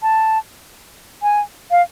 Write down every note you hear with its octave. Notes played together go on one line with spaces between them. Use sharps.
A5
G#5
F5